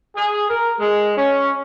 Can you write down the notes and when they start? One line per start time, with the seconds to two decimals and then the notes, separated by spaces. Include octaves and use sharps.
0.17 G#4
0.49 A#4
0.79 G#3
1.16 C#4